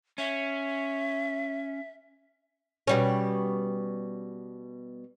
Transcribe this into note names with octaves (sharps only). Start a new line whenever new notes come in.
C#4 E5
B2 G3 C#4